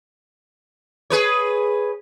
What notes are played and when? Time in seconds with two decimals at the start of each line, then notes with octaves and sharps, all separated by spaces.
1.10 G#4 B4 C#5